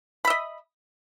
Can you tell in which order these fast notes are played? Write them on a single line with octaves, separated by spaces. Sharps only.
B5 E5 D#5